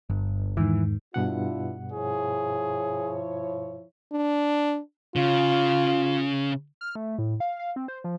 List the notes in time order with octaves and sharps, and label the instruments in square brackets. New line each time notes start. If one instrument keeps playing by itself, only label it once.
[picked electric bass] G1 [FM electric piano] G2
[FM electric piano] E2 G#2 D#3 [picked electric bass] E3
[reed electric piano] G2 B2 F#5 [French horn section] D4 E4 F4
[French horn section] F3 E4 C#5 [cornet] G#4
[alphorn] D4
[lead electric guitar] C#3 [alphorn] F4
[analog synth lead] F6
A3
A2
F5
F5
C4
C5
F3